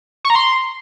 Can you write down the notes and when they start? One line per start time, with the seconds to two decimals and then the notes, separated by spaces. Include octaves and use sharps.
0.24 C#6
0.30 A#5
0.35 C6